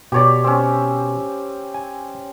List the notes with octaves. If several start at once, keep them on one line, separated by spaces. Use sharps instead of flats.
B2 G4 C#5 D5
C4 C#4
G#5